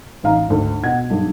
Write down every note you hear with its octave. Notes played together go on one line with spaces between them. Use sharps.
A1 D#4 F5 A#5
G#1 D2
B2 F#5 G#6
B1 G2